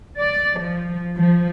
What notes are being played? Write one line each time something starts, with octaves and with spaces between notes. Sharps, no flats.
D5
F3
F3